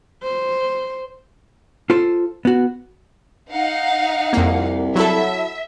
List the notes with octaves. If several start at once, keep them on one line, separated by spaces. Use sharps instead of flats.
C5
F4 A4 C5
B3 F#4
D#4 F5 F#5
C2 F2 A#3
F#3 E4 A4 E5